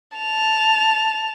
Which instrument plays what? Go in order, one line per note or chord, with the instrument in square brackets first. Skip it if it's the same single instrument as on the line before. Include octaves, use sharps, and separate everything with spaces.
[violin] A5 F7